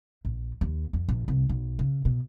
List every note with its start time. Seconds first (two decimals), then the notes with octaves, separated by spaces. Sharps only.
0.25 A#1
0.61 D#2
0.93 F2
1.09 A#1
1.28 C2
1.49 B1
1.79 C#3
2.05 B2